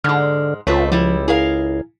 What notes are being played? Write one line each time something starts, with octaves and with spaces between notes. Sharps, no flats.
G#2 D3 G#3 F6
C#2 A3 C4 F4 B4 C#5
F3 G3 E4
E4 G#4 A#4 F5